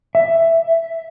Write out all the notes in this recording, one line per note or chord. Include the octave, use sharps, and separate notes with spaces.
E5